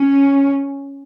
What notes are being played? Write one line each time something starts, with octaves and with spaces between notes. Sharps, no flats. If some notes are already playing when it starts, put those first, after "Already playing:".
Already playing: C#4